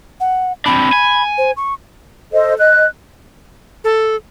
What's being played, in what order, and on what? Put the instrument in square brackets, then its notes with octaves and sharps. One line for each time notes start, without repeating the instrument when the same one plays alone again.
[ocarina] F#5
[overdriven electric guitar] C4 D4 [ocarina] B5
[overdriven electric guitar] G#5
[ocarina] C5
C#6
[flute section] A4 C5 D#5
D#5 F#6
[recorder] A4